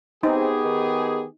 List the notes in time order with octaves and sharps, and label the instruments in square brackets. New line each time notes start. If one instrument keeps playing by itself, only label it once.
[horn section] B3 G4 G#4 [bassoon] C4 [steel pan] D#4
[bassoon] D#3